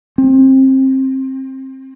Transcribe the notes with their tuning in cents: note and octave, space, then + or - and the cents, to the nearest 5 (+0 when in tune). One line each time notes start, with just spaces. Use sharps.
C4 +25